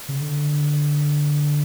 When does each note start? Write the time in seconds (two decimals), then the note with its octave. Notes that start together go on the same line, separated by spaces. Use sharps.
0.09 C#3
0.21 D3